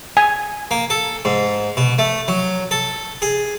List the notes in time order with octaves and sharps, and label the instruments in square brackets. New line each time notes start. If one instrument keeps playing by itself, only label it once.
[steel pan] G#5
[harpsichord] A#3
A4
G#2
B2
A3
F#3
A4
G#4